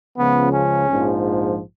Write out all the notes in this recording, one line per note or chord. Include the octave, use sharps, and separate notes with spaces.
C#2 C#3 F3 B3
C#4
A#1 G#2 F3